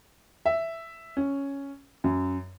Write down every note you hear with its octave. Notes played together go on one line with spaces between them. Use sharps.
E5
C#4
F#2